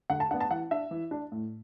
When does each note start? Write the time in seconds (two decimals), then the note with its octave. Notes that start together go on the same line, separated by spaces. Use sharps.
0.10 D3 F#5
0.20 A5
0.31 D4 F#5
0.34 B3
0.40 A5
0.51 E3 F#5
0.71 D4 E5
0.91 E3
1.11 D4
1.32 A2